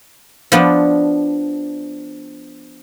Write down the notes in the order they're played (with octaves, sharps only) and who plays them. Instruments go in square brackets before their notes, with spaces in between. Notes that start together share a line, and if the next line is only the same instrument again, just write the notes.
[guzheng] F3 B3 D4